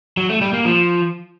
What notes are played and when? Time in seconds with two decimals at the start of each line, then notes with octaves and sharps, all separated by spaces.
0.17 F#3
0.29 A3
0.41 G3
0.53 A#3
0.65 F3